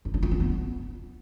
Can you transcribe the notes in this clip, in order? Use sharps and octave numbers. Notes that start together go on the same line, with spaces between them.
D#4
D4
F4
D4
B3